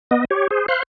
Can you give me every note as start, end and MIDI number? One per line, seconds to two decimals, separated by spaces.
0.11 0.25 59
0.11 0.25 75
0.31 0.47 67
0.31 0.47 73
0.51 0.66 68
0.51 0.66 72
0.68 0.83 72
0.68 0.83 77
0.68 0.83 84
0.68 0.83 90